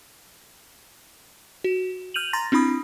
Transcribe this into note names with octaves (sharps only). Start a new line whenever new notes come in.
F#4
F6 G6 D#7 F7 F#7
A#5 C6 A6 A#6
C4 D4 E4 B5 D#6